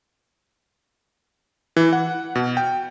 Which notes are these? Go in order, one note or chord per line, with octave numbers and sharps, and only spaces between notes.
E3
F#5
B2
G5